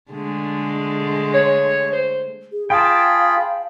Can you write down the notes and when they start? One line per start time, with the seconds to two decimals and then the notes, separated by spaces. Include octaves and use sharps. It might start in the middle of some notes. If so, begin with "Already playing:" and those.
0.11 D3 G#3 A3
1.34 C#5
1.93 C5
2.52 G#4
2.70 F4 G#4 F5 G5 A5 B5